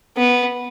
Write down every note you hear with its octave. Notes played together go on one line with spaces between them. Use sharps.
B3